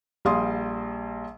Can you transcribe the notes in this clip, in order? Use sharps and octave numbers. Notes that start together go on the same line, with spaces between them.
A#1 G3 F5 C6 D#6